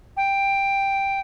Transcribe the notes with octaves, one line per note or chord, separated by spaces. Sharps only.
G5